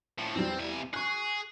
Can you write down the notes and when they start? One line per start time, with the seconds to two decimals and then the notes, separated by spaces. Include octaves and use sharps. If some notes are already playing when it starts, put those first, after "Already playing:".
0.19 A2 F3
0.35 E2 G3 C4
0.59 C3 G#5
0.94 G#4 C#6 F#6